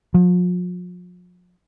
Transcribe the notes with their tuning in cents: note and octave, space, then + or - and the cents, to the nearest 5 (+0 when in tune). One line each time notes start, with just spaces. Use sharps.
F3 +40